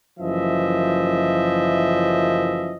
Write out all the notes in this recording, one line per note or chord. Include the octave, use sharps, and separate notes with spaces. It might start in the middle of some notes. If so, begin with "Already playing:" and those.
F#1 F#2 E3 F3 D#5 E5